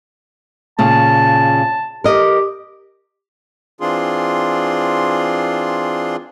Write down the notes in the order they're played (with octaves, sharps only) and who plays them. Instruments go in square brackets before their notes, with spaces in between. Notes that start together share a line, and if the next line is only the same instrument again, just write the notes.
[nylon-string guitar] A#2 C#3 [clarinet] A5
[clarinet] G4 [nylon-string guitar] A#4 D#5
[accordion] E3 C4 D4 F4 G#4 C6